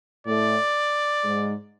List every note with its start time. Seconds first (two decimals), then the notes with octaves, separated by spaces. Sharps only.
0.27 A2 A3 D5
1.24 G#2 G#3